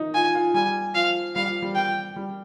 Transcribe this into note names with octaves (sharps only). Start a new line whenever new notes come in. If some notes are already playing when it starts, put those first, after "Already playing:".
Already playing: D#4
F4 G#5
F4
G3 G#5
F3 F5
G3 F5
F3
G3
G5
G3